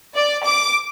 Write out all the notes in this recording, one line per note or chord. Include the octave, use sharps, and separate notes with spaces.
D5
D6